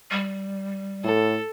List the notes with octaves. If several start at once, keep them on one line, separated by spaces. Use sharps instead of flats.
G3
A2 A4